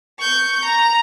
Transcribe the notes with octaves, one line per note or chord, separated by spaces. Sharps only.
C#6 G6
A#5